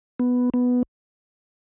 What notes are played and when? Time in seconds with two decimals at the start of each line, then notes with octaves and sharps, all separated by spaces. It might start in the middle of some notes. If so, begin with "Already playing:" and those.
0.20 B3
0.54 B3